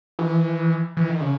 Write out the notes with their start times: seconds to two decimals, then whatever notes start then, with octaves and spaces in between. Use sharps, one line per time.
0.19 E3
0.97 E3
1.09 D#3
1.21 C#3